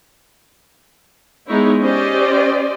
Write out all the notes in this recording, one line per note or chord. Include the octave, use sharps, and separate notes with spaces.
G#3 B3 D#4 E4 C#5
C#4 G4 C5 D5 D#5